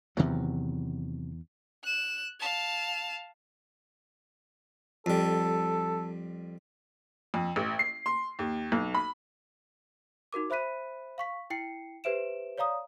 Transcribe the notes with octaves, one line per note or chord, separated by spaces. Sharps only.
E2 C3 D#3 F#3
F#6 E7
F5 A5
F2 G3 A4
F2
A1
C7
C6
D#2
B1
B5
D#4 F#4 A#4 D6
C5 E5 B5 F#6 B6 D#7
F5 C#6 B6
E4 G5 C7 C#7
G4 B4 C5 E5 D7 E7
C#5 D5 F5 A#5 D#6